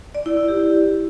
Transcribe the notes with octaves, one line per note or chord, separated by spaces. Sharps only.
D5
E4
E4
G4